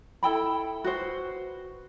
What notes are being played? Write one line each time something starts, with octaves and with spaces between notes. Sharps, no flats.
E4 A4 G5 B5
F#4 B4 C5